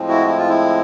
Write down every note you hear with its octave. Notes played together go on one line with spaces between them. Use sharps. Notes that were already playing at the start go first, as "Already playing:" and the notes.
Already playing: A2 F3 G#3 C4
E4 F#4
E4
F4
E4